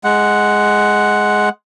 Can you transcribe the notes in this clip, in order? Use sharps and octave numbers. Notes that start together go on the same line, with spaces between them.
G#3 F#5